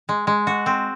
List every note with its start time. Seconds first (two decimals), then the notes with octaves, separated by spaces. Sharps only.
0.09 G#3
0.27 G#3
0.47 F#4
0.66 C4